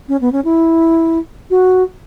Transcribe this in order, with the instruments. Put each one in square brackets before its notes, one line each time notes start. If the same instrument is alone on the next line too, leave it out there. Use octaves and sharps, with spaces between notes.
[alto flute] C#4
B3
C#4
E4
F#4